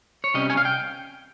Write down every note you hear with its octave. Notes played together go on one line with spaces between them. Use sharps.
C#5
C3 G3 C#4 D#5
G#5
F5
G5